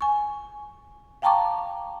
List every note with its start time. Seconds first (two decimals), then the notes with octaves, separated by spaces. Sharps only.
0.01 G#5 C#6
1.22 F5 G5 A5 A#5 C#6 D6